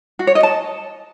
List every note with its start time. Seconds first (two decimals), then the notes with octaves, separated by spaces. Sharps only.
0.19 F#4
0.27 C#5
0.35 D#5
0.43 A5